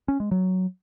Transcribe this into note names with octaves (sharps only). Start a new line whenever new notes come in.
C#4
G#3
F#3